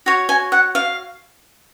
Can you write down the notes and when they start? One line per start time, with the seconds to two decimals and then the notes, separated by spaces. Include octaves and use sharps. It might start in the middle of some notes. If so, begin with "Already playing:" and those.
0.06 F#4 C#5
0.29 G#5
0.52 F#5
0.75 F5